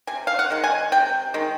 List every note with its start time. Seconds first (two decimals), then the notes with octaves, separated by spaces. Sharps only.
0.07 C3 G#5
0.27 F5
0.39 F#5
0.50 D#3 G#3
0.64 G#5
0.92 C3 G5
1.34 D#3 G#3